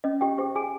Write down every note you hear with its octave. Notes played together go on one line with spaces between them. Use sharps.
C#4 D#5
G4 G5
G4 G#4 C5 G5
G#4 G#5